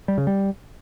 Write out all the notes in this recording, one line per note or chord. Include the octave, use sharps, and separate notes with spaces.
G3
C#3
G3